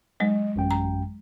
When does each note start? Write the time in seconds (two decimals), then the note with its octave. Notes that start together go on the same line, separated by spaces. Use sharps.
0.20 F#3 G#3 D#5
0.56 A1 F#2 G5
0.71 A#5